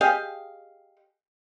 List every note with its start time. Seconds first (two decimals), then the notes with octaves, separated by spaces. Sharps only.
0.01 G4 G#4 D#5 F5